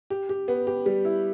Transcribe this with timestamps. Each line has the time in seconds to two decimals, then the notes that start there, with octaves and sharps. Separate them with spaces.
0.10 G4
0.29 G4
0.48 B3
0.67 G4
0.86 G3
1.05 E4